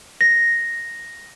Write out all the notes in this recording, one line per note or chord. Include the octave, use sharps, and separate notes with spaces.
A#6